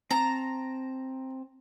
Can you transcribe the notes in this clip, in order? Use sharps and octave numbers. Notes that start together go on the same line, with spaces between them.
C4 A5 A#5